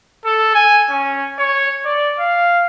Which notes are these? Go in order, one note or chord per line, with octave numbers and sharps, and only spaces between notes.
A4
G#5
C#4
C#5
D5
F5